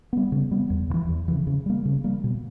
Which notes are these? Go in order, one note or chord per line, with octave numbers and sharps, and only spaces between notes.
G3 B3
C#3
G3 B3
E2
C#3
E3
E2
C#3 E3
C#3
G3 A#3
C#3
G3 A#3
B2